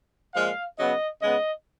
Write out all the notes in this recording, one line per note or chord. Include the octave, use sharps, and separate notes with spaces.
A#2 F3 G#3 F5
C#3 F#3 B3 D#5
C#3 G#3 B3 D#5